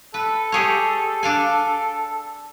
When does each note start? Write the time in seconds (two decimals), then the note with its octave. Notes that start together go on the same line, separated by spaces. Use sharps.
0.14 A4 B4
0.52 G4 G#4 C#5
1.23 D4 F5 G#5